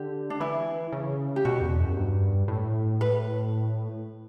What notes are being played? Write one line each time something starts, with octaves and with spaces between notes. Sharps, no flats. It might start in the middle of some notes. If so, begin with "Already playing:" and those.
Already playing: D3 G4
D4
E3 E4
C#3
G4
B2 F#4
E2
F#2
G2
A2
B4